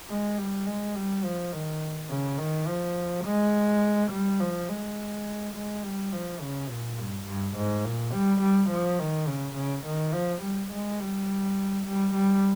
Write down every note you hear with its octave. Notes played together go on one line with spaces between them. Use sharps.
G#3
G3
G#3
G3
F3
D#3
C#3
D#3
F3
G#3
G3
F3
G#3
G#3
G3
F3
C#3
A#2
G2
G2
G#2
A#2
G3
G3
F3
D#3
C#3
C#3
D#3
F3
G3
G#3
G3
G3
G3